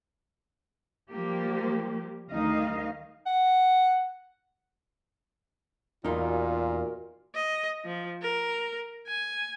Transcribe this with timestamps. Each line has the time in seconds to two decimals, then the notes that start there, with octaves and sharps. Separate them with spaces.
1.10 F3 G3 A#3 G4
2.32 D2 D#3 G3 D#4 D#5 F5
3.26 F#5
6.04 E2 A#2 D#4 F4 F#4 A#4
7.35 D#5
7.85 F3
8.22 A#4
9.07 G#5